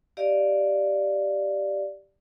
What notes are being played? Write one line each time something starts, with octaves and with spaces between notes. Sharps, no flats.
G4 D5 D#5 F5